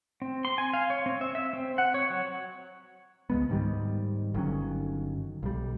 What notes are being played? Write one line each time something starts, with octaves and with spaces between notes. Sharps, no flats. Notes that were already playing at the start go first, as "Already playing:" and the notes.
C4
C6
G#5
F5
C#5
C4
E5
E5
C4
F#5
C#5
F#3
C#2 G#3 B3
G#2 D#3 F#3 G3
G1 D#3 F#3 C#4
B1 G3